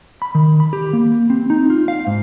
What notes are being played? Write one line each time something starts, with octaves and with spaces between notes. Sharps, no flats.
B5
D#3
B5
G4
A#3
C4
D#4
F4
F5
G#2